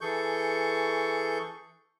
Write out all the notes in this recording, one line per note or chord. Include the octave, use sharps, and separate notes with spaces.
E3 G#4 A4 C#6 G6